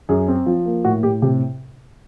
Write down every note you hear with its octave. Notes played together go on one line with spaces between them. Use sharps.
F#2 G#4
C4
F3
A#3
A2 F#4
A2 G4
C3 G4